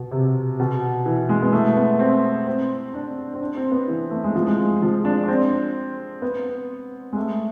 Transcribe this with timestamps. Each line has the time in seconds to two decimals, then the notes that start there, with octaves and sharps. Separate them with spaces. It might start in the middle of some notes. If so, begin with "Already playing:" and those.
Already playing: B2
0.11 C3
0.60 B2
1.06 E3
1.29 G#3
1.42 B3
1.52 A3
1.76 B3
1.99 C4
2.47 C4
2.94 D4
3.34 C4
3.41 D4
3.57 C4
3.71 B3
3.88 E3
4.11 A3
4.24 G#3
4.35 F3
4.47 G#3
4.82 F3
5.05 D4
5.24 D4
5.28 C4
6.22 B3
7.13 G#3
7.16 A3